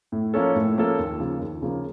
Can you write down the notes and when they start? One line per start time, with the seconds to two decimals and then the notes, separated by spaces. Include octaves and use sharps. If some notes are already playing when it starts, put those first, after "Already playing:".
0.12 A2
0.34 F3 A#3 C#4 A4
0.56 A2
0.77 F3 A#3 C#4 A4
0.98 D#2
1.20 C#3 F3 A#3
1.40 D#2
1.62 C#3 F3 A#3